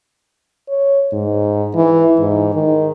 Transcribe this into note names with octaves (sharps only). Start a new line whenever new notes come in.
C#5
G#2
E3
G#2
D#3